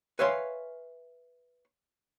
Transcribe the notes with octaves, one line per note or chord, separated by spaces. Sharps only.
B4 C#5 E5 F5 G#5 C6